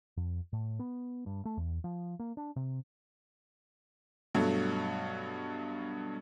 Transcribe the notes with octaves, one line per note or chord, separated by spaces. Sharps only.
F2
A2
B3
G2
A3
E2
F3
A#3
D4
C3
G2 B2 F#3 A3